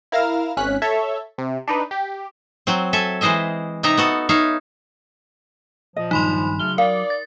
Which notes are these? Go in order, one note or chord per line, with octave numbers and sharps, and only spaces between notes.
E4 A#4 F5 F6 A#6 E7
G#1 C#4 F#6 B6
A4 C#5 E5
C3
D4 D#4 B4
G4
F#3 C4
A4 E5 G#5
E3 G#3 C5 D#5 E5
C3 D#4 D#5 E5 A#5
B3 F#4 A4
D#4 C#5 E5 F5
A#2 F3 D#5
G2 D#3 F#3 D#4 B5 C6
C#3 F#3 A3 F6 G7
A#4 D5 F5
A6